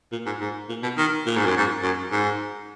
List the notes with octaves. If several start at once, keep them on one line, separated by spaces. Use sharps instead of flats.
A#2
G#2
G#2
A#2
B2
D#3
A#2
G#2
F#2
G#2
F#2
G#2